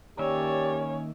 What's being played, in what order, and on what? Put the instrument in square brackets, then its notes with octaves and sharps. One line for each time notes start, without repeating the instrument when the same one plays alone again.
[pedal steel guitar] D#3 A#3 E5 [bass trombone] C#4 [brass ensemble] G4 D5 [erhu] C#5